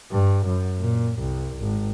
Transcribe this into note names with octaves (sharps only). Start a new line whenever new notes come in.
G2
F#2
A#2
C2
G#1